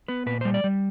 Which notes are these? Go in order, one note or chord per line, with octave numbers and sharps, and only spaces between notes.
B3 B4
A#2 B4
G3 C5
D5
G3